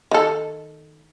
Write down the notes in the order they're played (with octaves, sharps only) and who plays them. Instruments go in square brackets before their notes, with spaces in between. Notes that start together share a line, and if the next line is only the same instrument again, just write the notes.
[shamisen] D#3 A4